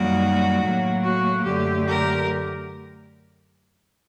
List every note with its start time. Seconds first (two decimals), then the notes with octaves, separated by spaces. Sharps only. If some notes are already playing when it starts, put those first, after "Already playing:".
Already playing: F#2 D#3 G3 A#3 F#4
0.60 A2 F#3 A#3
1.02 F#4
1.43 F#2 D3 A3 G4
1.86 G4 A#4